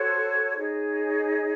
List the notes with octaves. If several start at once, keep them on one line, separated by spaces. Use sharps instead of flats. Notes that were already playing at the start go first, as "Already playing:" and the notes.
Already playing: F#4 A4 C5 C#5
D#4 G#4 C#5